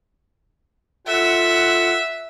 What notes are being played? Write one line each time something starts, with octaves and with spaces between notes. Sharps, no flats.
F4 A4 E5 F#5